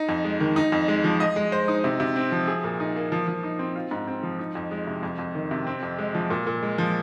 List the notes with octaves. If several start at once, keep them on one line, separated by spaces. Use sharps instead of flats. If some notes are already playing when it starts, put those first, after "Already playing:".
Already playing: D#4
F2
G#3
D#3
D#4
F2
G#3
F3
D#5
G#3
C5
D#4
C3
C3
C4
F3
G#4
A#2
D#4
A#3
F3
F3
D#4
C4
F4
G#2
C4
F3
D#4
F2
G#3
C3
F2
F2
D#3
C3
C4
F2
G#3
F3
A#2
A#2
G#3
F3